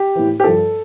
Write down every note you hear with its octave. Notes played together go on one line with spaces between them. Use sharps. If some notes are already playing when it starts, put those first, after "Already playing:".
Already playing: G4
A2 E3
G4
G2 F3 A4